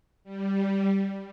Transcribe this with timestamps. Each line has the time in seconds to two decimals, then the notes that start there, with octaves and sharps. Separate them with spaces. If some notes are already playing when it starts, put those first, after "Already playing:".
0.24 G3